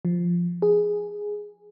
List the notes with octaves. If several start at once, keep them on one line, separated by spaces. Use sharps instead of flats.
F3
G#4